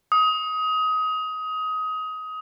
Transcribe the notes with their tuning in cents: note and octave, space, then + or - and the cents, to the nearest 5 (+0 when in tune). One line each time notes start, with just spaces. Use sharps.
D#6 +20